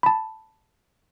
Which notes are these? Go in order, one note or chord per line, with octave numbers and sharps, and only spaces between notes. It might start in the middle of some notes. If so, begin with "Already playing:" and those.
A5 B5